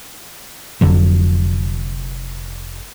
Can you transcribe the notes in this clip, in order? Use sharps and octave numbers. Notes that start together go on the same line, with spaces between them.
F1 F2 D3 F#3